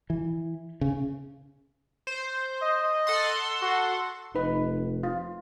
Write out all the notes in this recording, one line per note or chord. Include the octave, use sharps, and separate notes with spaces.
E3
C#3
C5
D#5
A4 F#5 C6
F#4
F1 D#4 B4
F4